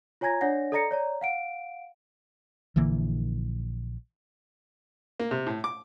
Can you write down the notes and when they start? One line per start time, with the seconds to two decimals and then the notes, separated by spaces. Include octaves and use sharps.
0.21 F4 C#5 G#5 A#5 G#6 A#6
0.41 D4 C#5 D5 F#5 A#6
0.72 A4 D5 D#5 A#5 A#6 C#7
0.91 C#5 D5 A#5
1.21 F5 F#5 D7
2.76 A#1 D3 E3 A#3
5.20 A#3
5.31 C3
5.47 A2
5.64 D6